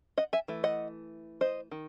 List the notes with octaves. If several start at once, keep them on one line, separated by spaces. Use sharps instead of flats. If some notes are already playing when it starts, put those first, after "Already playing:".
D#5 F#5
E5 G#5
E3 A3
D#5 F#5
C5 D#5
D#3